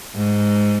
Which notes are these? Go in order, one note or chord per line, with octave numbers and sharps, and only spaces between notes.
G#2